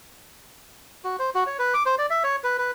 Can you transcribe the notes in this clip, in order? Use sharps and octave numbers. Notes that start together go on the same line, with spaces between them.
F#4
C5
F#4
C#5
B4
D6
C5
D5
E5
C#5
B4
B4